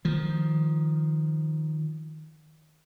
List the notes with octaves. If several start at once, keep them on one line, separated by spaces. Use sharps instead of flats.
D#3 F3